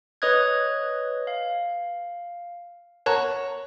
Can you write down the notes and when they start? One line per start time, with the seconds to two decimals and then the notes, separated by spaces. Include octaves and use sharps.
0.22 B4 C#5 D#5 D#6 F#6 G#6
1.27 F5
3.06 A#4 C#5 F#5 A5 A#5 F#6